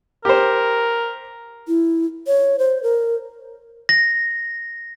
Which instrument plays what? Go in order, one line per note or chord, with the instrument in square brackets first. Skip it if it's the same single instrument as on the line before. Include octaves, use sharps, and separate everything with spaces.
[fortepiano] G4 C5 [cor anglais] A#4
[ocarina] E4
C#5
C5
A#4
[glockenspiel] A#6